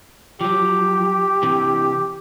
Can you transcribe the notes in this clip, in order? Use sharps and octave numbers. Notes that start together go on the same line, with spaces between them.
F3 F#3 G4
C3 E3